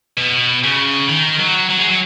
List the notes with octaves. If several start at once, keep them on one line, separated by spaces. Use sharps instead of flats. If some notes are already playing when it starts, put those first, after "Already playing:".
B2
C#3
D#3
F#3
F#3
G#3
F#3